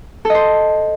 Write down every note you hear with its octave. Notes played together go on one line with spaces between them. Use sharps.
A4 C5 D#5